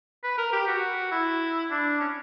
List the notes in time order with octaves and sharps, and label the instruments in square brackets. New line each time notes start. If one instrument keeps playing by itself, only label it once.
[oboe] B4
A#4
G4
F#4
E4
D4
C#4